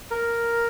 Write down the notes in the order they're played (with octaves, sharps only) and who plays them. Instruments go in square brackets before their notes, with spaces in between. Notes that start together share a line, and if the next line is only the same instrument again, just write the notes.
[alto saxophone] A#4